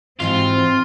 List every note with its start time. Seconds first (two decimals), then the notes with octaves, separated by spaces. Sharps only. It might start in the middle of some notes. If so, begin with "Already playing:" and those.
0.20 G#2 E3 C4 F4 F#4